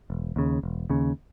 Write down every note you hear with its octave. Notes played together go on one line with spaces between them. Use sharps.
E1
D#2 C#3
E1
D#2 C#3